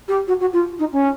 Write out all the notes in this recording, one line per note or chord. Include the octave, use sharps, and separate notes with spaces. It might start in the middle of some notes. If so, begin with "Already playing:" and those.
G4
F#4
F#4
F4
D#4
C#4